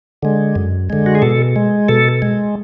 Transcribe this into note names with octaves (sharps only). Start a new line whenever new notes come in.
D3 G#3
F#2
D3 G#3
F#4
G#4
B2 A4
G#3
B2 A4
G#3